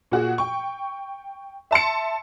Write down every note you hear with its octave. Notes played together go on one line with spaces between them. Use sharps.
A#2 F#4 G#4
G5 C#6
E5 A5 C6 C#7